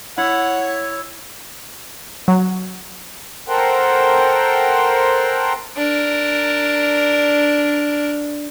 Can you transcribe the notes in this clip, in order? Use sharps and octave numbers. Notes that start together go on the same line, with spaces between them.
E4 C#5 F#5
F#3
A4 A#4 C5 F#5 G5
D4 A#4